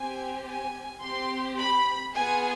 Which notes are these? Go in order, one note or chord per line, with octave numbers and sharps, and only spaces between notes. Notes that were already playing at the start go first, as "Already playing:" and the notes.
Already playing: C4 G4 G#5
G#5
C4 G4 C6
B5
B3 F4 G#4 G#5